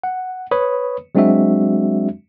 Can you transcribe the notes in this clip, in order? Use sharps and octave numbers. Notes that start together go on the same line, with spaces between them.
F#5
B4 C#5 B5 D#6
F#3 G#3 C4 D4 F#4 E5